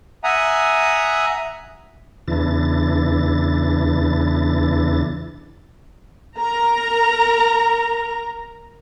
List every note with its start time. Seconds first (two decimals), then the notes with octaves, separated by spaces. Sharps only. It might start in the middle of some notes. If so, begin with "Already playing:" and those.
0.24 E5 F#5 G#5 A#5 D#6
2.28 E2 C#3 E3 D4 E4 A6
6.39 A#4 A#5